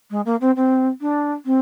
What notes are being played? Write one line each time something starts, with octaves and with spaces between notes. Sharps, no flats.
G#3
A#3
C4
C4
D4
C4